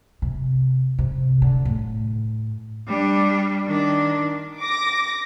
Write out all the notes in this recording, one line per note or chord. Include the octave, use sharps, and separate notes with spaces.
C3
C3
D3
A2
G3 D4
D#3 D4
D6 A#6